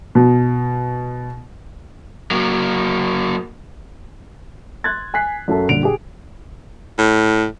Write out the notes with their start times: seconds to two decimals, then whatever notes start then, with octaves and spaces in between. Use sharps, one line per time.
0.15 B2
2.31 F#3 A#3
4.84 C6 F#6 G#6 A6
5.14 G#5 F#6 B6 C7
5.48 F#2 F#3 A3 F#4 A4 A5
5.69 A#1 D3 G3 D7 F7
5.83 G4 G#4
6.98 A2